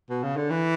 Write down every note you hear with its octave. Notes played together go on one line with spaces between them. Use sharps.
B2
C#3
D3
E3